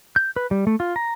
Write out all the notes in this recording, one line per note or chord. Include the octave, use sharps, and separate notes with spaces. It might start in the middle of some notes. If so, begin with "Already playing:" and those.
G6
B4
G3
A3
F4
A#5